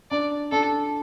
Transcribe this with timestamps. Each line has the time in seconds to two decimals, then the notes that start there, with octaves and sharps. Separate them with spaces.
0.11 D4 D5
0.52 D4 A4